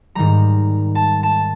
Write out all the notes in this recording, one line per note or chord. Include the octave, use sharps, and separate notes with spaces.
G#2 D#3 G3 A#5
A5
A5